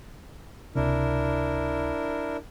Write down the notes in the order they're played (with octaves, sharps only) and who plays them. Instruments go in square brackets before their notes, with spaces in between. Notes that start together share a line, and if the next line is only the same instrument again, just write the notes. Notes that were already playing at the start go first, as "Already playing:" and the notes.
[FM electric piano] C#2 C3 [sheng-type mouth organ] D4 E4 A#4